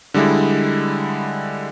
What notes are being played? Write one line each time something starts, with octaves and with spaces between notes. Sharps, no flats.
D3 G3 G#3 E4